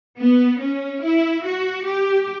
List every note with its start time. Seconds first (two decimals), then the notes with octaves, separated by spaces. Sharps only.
0.18 B3
0.60 C#4
1.01 E4
1.44 F#4
1.85 G4